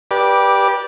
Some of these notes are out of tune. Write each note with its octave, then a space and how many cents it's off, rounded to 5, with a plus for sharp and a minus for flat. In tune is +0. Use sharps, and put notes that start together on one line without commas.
G4 +5 B4 -25 D5 +0